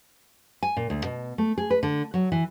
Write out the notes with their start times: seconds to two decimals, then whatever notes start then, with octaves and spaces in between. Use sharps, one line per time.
0.63 G#5
0.77 A#2
0.90 D2
1.05 B2
1.38 A3
1.58 G#4
1.70 B4
1.83 D3
2.14 F#3
2.32 E3